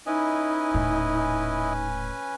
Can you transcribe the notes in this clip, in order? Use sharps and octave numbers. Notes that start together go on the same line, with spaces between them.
C#4 D#4 E4 B4 D#5 G#5
D#1 A2